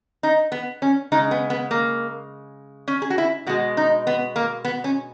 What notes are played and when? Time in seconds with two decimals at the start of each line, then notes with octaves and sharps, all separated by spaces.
0.23 D#4
0.52 B3
0.82 C#4
1.12 C#3 G#3 D#4
1.31 B3
1.50 B3
1.71 A#3
2.88 C#4
3.02 G#4
3.10 F#4
3.18 E4
3.47 B2 G#3 F#4
3.77 D#4
4.07 B3
4.36 A#3
4.65 B3
4.84 C#4